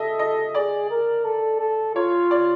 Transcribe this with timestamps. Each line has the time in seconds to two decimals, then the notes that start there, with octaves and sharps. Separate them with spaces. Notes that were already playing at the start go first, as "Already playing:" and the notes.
Already playing: A4 D#5 E5
0.19 D#5
0.55 G#4 D5
0.90 A#4
1.25 A4
1.60 A4
1.95 F4 C#5
2.31 D5